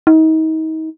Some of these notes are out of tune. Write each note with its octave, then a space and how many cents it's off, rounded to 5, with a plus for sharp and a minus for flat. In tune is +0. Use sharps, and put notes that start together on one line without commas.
D#4 +35